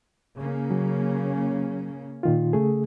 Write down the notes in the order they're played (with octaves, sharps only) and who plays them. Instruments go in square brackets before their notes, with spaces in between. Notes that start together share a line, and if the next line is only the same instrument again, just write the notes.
[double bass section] C#3 A#3 C#4
[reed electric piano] F#3
A#2 D#3 F4
C#3 A3 G#4